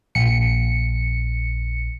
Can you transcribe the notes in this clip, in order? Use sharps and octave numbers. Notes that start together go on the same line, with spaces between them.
A#1 C#7